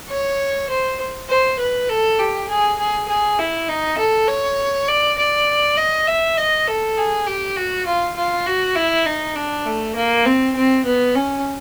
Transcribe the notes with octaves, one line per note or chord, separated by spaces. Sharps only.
C#5
C5
C5
B4
A4
G4
G#4
G#4
G#4
E4
D#4
A4
C#5
D5
D5
D#5
E5
D#5
A4
G#4
G4
F#4
F4
F4
F#4
E4
D#4
D4
A3
A#3
C4
C4
B3
C#4